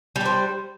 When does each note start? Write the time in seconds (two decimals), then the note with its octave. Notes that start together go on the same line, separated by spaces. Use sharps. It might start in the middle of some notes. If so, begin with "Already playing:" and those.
0.16 G3
0.21 D4
0.25 C5